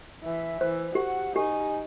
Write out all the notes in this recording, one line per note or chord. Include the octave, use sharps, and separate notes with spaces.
E3 E5
E3 C5
F#4 G4 F#5
D#4 G4 G#5